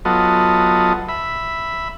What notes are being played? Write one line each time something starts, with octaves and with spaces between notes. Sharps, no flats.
F#3 B3 F4 A4 D#5
E5 B5